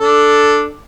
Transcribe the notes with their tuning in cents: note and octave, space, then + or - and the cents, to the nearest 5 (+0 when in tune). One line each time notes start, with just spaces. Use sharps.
D4 +0 A4 +0